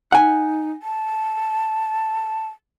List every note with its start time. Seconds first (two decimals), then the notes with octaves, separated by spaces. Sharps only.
0.12 D#4 F#5 G#5
0.83 A5